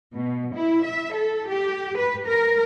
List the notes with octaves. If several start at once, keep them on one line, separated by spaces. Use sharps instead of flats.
B2
E4
E5
A4
G4
B4
A#4